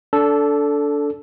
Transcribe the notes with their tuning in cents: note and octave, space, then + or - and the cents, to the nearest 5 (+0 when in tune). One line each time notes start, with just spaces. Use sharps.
D4 -20 A4 +0